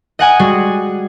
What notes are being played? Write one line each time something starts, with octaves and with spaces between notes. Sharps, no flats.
D#5 F#5 G#5 D#6
G3 G#3 F#4 G#4